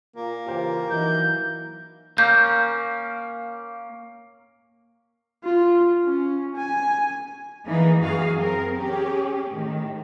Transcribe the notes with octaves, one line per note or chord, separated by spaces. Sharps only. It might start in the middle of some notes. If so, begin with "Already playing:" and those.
A#2 A#3
C#3 E3 F4 G4 A#4 C5
E3 F#3 D#4 E4 G6
A#3 C#4 G6
F4
C#4
G#5
E3 A#3 D#4 G#4
F#2 E3 F#4 G#4 F5
C4 A#4
C#4 G4 G#4
A2 D#3